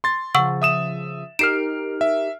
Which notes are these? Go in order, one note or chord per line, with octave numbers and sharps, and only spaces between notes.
C6 A6
C#3 F3 F#5 C#6 E6
E5 D#6 E7
D#4 G4 A#4 F6 C7 D7 E7
E5